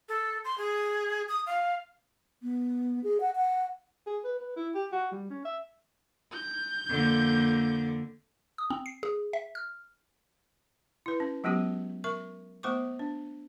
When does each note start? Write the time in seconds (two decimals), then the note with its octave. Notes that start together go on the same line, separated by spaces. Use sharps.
0.09 A4
0.45 C6
0.58 G#4
1.29 D#6
1.46 F5
2.42 B3
3.04 G#4
3.20 F#5
3.35 F#5
4.07 G#4
4.24 B4
4.39 B4
4.56 E4
4.75 G4
4.92 F#4
5.12 G3
5.30 C#4
5.45 E5
6.33 G6
6.87 F2 D3 A#3
8.58 D#6
8.70 C4
8.86 C7
9.03 G#4
9.33 E5
9.55 F6
11.06 E4 B4
11.20 C#4
11.44 F#3 G#3 B3 C#4 F#4 G4
12.04 A#4 E5 C#6
12.63 A3 B3 C5 C#6 D6
12.99 D4